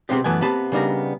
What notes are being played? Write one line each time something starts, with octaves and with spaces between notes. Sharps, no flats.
C3 D#3 G#3 B3 C4 G4
F#2 E3 A3 B3 G#5
C3 A#3 B3 B4 A5
C#3 G3 B3 D4 D#4 A#4